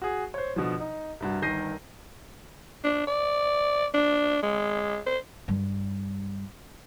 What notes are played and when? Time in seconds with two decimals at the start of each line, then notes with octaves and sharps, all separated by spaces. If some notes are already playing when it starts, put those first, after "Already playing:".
0.02 F#4 G#4
0.34 C5 C#5
0.56 B2 D3 F3
0.80 D#4
1.20 C2 G2 F#4
1.42 G1 D#3 G6 A#6 C7 D#7
2.84 D4
3.07 D5
3.94 D4
4.42 G#3
5.06 C5
5.48 G2 G3